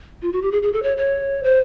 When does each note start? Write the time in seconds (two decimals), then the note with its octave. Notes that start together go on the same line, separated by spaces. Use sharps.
0.22 F4
0.32 F#4
0.42 G4
0.52 G#4
0.63 G#4
0.73 A4
0.83 C#5
0.97 C#5
1.43 C5